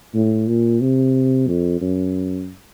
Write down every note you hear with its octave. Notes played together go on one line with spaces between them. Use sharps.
A2
A#2
C3
F2
F#2